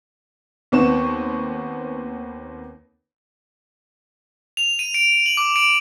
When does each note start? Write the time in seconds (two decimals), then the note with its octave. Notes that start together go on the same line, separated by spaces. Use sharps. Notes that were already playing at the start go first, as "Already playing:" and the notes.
0.72 D#2 B3 C4 C#6 E7
4.57 F7
4.79 D#7
4.94 D7
5.26 F#7
5.37 D6
5.56 D7